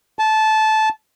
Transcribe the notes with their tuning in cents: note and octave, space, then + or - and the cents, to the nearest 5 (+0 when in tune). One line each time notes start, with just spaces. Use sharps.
A5 -15